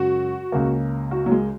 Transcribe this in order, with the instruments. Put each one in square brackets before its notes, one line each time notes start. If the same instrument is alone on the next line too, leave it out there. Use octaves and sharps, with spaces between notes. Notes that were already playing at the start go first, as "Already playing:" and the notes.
Already playing: [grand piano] F#2 C#3 G#3 [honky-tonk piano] F#4
[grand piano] C#2 C#3 A#3
[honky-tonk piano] F#4
F#3
G#3